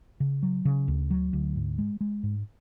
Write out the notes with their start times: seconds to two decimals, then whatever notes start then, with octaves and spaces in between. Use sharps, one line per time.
0.20 C#3
0.43 F#3
0.65 C#3
0.88 D2
1.10 F#3
1.33 D2
1.56 G#2
1.78 G#3
2.01 G#3
2.23 G#2